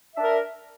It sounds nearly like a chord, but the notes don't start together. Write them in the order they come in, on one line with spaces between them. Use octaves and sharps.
E5 D4 A#4